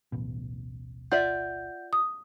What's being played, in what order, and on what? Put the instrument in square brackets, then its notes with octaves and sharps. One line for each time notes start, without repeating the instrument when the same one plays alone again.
[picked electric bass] D1 A1 B2
[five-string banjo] F4 D5 E5 [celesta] F#5 G6
[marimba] D#6